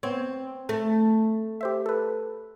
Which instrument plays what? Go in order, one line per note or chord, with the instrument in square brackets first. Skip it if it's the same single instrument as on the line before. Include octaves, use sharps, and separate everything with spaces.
[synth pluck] B3 C#5 [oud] C4
[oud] A3
[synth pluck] G4 C5 E5
A4 B4